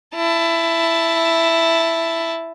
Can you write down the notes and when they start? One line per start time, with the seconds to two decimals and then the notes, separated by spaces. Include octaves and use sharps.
0.15 E4 A5